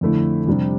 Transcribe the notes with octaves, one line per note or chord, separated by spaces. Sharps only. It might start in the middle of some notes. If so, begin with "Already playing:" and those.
F2 D3 A3 E4
F2 C3 G3 D4